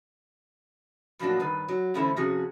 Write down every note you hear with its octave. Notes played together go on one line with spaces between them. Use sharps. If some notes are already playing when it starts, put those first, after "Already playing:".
A2 F3 F#3 A#3 D4 F#4
G2 D#3 B4
F#3
D3 E3 A3 C#4 E4 C5
C3 F3 C#4 F#4 G#4